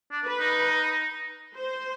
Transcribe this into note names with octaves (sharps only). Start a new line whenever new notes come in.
D4
B4
D#4
C5